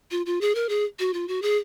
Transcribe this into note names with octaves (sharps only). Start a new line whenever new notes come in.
F4
F4
G#4
A#4
G#4
F#4
F4
F#4
G#4